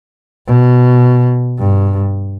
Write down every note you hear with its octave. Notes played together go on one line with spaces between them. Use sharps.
B2
G2